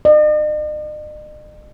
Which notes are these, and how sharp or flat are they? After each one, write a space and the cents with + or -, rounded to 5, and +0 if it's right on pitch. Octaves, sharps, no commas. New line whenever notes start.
D#5 -45